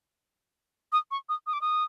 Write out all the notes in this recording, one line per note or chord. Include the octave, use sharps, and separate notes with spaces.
D#6
C#6
D#6
D#6
D6
D#6